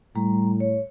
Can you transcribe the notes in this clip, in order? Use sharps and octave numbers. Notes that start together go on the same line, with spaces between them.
A2 G3 A#5
C#5